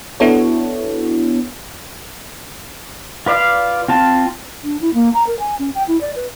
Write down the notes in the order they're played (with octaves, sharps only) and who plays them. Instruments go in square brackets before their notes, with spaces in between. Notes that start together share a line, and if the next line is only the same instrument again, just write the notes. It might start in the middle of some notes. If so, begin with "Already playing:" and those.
[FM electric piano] B3 D4 E4 F#4 A4 C#5
[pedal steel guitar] F4 B4 D5 F5
C4 F4 A5
[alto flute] D4
E4
A#3
A#5
A#4
G#5
C#4
G5
E4
D5
B4